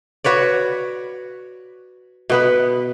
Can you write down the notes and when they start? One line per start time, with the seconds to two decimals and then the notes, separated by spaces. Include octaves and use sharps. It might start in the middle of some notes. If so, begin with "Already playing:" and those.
0.24 F#4 B4 C#5 D5
2.30 B2 B3 B4